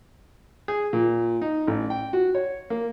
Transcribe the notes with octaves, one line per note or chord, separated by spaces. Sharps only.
G#4
A#2
D#4
A1
G5
F#4
C#5
A#3